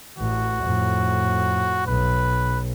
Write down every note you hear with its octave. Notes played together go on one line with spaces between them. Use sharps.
A1 F#4
F2 A2
B1 B4